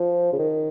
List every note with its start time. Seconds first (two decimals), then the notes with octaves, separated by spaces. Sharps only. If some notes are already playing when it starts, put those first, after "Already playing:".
Already playing: F3
0.33 C#3
0.39 D#3